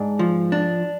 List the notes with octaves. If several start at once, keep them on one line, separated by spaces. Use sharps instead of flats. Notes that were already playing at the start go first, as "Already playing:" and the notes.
Already playing: G#2 D4
F3
D4